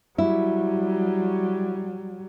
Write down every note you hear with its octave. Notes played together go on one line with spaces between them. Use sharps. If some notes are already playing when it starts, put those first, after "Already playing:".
F#3 G3 E4